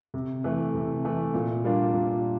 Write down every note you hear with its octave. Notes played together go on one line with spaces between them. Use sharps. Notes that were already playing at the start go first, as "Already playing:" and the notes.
C3
E3 A3
C3
E3 A3
A#2
G3 A#3 D4 F4
A#2